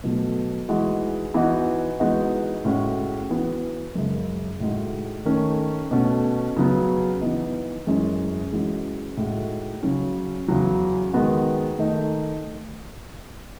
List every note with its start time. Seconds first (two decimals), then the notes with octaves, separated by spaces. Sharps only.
0.04 B2 F#3 A3
0.68 E3 G#3 D#4 F#4
1.34 E3 B3 D#4 F#4
2.00 E3 G#3 B3 D#4 F#4
2.65 A2 G#3 C#4 F#4
3.30 E3 B3 F#4
3.95 F#2 C#3 G#3
4.60 A2 G#3 D#4 F#4
5.26 D#3 A3 C#4
5.91 B2 A3 C#4 F#4
6.57 C#3 F#3 B3
7.21 E3 B3 D#4
7.87 F#2 E3 G#3 C#4
8.52 E3 G#3 C#4 F#4
9.17 A2 G#3 D#4 F#4
9.83 C#3 F#3 C#4
10.48 E2 C#3 F#3
11.13 D#3 G#3 B3 F#4
11.79 D#3 A3 D#4